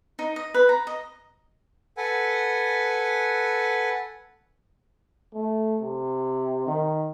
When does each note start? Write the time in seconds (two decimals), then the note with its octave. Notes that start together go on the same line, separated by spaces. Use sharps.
0.19 D#4
0.36 D#5
0.54 B4
0.69 A#5
0.87 D#5
1.97 A4 B4 F#5 G#5
5.34 A3
5.82 C3
6.67 D#3